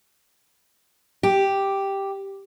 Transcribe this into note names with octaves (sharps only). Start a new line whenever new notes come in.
G4